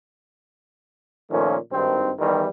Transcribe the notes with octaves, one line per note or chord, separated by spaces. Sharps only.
A#2 D#3 F3 A3 C#4
G#1 G2 D#3 C4
E2 D#3 E3 G3